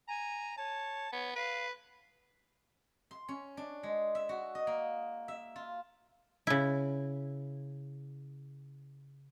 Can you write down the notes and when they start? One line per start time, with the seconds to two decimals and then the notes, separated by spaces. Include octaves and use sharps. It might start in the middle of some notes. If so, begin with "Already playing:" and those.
0.08 G#5 A#5
0.58 C#5 A5
1.12 B3 C#5
1.36 B4 F5
3.11 C6
3.28 C#4
3.57 D4
3.83 G#3
4.15 E5
4.29 F#4
4.55 D#5
4.67 A#3
5.28 E5
5.56 F4
6.47 C#3 E4